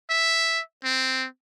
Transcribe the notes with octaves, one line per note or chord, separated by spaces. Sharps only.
E5
C4